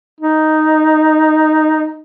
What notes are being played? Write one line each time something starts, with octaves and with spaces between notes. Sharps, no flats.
D#4